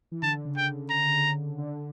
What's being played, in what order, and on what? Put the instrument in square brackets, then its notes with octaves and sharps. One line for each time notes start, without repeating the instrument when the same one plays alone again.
[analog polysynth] E3
[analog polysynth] D3 [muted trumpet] A5
[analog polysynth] C#3
[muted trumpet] G5
A#5
[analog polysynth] D3